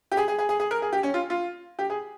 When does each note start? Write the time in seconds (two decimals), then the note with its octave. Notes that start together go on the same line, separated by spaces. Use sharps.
0.12 G4
0.17 G#4
0.28 G#4
0.38 G#4
0.49 G#4
0.60 G#4
0.71 A#4
0.82 G#4
0.93 G4
1.03 C#4
1.14 F4
1.30 F4
1.79 G4
1.90 G#4